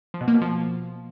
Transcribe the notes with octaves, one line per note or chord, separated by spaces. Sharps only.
F3
B2
A#3
B2
F3